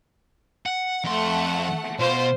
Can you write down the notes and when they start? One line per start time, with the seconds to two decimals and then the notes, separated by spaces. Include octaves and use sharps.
0.66 F#5
1.04 F2 A3 F#5 C6
1.99 B2 F4 C5